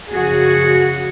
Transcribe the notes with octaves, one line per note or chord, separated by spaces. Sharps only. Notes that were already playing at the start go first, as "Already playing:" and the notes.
F#2 C#3 F3 F#4 G#4